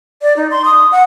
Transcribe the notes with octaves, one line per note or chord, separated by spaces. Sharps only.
D5
D#4
C6
D#6
F#5